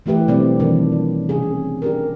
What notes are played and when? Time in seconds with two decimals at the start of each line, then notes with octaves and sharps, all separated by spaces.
0.06 E3 A3 E4 G4 B4
0.28 B2 F#3 G3 C4 D4 D5
0.60 D#3 E3 D4
0.92 D4
1.29 C3 C#4 G#4
1.82 D4 G4 A#4